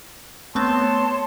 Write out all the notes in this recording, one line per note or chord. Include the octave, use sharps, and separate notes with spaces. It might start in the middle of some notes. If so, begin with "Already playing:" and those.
A3 B3 C4 C#5 A5 C6